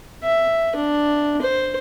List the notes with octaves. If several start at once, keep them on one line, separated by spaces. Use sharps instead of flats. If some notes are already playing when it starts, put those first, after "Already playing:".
E5
D4
C5